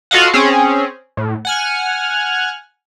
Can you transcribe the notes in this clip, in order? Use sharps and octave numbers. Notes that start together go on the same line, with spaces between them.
F4 F#4 A4 D#5 F5 F#5
C4 C#4 G#4
A2
F#5 G#5 F6